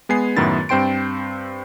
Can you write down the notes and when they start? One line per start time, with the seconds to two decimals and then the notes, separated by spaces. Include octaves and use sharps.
0.09 G#3 B3 G#5 C7
0.37 F#2 A2 D#3 B3 E4 A6
0.69 G2 C4 C5 G5 C6 D7